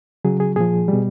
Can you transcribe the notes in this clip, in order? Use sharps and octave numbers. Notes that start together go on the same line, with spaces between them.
C#3 F#3 G#4
G#4
A#2 F3 G#4
B2 G3